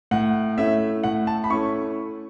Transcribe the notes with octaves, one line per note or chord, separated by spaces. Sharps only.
A2 F#5
A3 C#4 E4 E5
A2 F#5
A5
B5
A3 C#4 E4 C#6